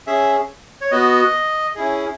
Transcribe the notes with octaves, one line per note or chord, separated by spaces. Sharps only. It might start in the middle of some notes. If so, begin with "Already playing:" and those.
C#4 G#4 E5
C#5
B3 F#4 D#5
C#4 E4 G#4